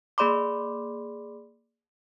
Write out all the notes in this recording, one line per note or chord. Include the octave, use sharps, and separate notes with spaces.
A#3 G#4 D5 B5 C6 D6